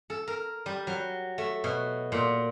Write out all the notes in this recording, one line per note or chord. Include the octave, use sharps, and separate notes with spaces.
A4
A#4
G3
F#3
A3
B2
A#2